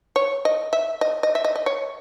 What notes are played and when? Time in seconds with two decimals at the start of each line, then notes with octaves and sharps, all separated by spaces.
0.16 C#5
0.45 D#5
0.73 E5
1.01 D#5
1.23 D#5
1.35 E5
1.45 D#5
1.56 D#5
1.66 C#5